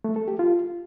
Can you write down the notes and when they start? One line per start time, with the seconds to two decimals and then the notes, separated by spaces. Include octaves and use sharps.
0.04 A3
0.16 A4
0.28 G4
0.39 F4